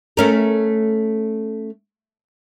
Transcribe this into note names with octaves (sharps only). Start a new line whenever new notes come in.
A3 C#4 A#4